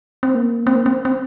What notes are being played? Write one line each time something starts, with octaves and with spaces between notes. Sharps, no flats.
C4
A#3
C4
A#3
C4
C4